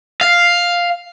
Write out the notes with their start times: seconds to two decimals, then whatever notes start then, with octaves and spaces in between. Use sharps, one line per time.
0.21 F5